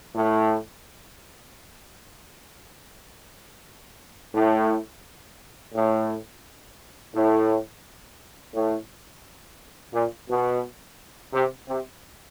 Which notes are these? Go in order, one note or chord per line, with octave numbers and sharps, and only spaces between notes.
A2
A2
A2
A2
A2
A#2
B2
C3
C3